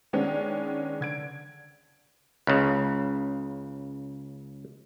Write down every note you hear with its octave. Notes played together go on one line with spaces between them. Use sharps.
D#3 G#3 B3 C#4 D4
D3 G#6 D7
C#2 C#3